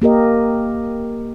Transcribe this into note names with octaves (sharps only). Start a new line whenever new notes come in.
A#3 G4 A#4 D#5